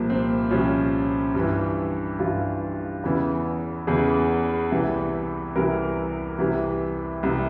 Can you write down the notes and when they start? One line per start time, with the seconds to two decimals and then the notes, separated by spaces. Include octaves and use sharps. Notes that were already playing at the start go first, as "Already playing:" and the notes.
Already playing: C2 A#2 F3 A#3
0.10 C4
0.51 C2 A#2 F3 C#4
1.35 G2 E3
2.19 G2 E3 F4
3.04 E2 C#3 E3
3.87 E2 C#3 E3 G#4
4.71 C2 C3 E3
5.56 C2 C3 E3 A#4
6.39 C2 C3 E3
7.23 C2 C3 E3